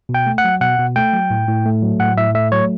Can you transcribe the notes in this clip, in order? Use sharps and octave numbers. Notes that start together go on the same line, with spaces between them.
B2
G5
A3
F#5
F#3
B2 F#5
B2
A3 G5
F#3
A2
A2
A3
F#3
A2 F#5
A2 E5
A3 E5
F#3 C#5